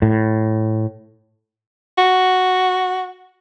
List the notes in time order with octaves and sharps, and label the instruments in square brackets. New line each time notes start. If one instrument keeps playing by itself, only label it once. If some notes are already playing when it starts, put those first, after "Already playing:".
[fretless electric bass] A2
[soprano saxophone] F#4